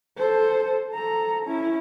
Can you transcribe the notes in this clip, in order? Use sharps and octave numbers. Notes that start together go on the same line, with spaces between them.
A4 C5
A4 A#5
C#4 E4